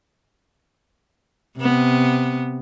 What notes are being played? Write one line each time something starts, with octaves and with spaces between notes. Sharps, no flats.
C3 B3